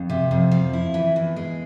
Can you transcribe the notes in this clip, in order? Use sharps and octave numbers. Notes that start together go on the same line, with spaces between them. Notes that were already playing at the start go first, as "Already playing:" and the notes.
Already playing: F2
C3
F2
F3
E4
E3
E2
G#3